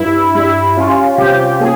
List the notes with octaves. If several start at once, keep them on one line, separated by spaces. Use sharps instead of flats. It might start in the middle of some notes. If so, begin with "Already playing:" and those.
Already playing: G2 E4
G3 E4
C#4 F4
C3 G4
A#3 G#4